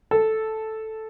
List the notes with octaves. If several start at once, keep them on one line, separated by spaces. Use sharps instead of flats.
A4